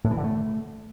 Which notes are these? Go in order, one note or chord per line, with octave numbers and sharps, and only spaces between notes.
A2
E3
D3
A3